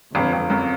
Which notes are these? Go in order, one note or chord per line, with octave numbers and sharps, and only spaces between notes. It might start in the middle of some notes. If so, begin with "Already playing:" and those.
G1 F2
G1
F#2